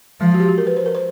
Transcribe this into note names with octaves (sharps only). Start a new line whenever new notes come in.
F3 G#3
F#4
G4
F#4
A#4
B4
C5
A#4
C5